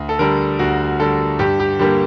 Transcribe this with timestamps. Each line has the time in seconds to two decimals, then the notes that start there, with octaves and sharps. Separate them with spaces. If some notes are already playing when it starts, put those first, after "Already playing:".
Already playing: D2
0.09 A4
0.19 D3 G3 A#4
0.59 D2 F#4
1.00 D3 G3 A4
1.39 G2 G4
1.60 G4
1.79 D3 G3 A#3 G4